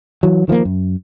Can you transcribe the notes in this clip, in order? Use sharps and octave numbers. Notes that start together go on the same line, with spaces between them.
E3 F#3
D#3 F3 A3 A#3
F#2